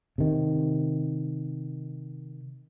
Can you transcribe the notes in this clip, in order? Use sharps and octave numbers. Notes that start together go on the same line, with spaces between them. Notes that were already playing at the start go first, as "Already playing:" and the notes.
C3 D#3